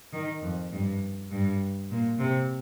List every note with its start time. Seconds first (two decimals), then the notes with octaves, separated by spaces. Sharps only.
0.13 D#3
0.42 F2
0.72 G2
1.31 G2
1.91 A#2
2.19 C3